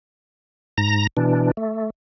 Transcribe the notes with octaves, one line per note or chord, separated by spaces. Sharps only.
G#2 A#5 A#6
B2 E3 D4
A3